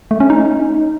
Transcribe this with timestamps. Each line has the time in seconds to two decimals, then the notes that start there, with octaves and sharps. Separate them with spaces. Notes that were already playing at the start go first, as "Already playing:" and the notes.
0.11 A3
0.20 C#4
0.30 D#4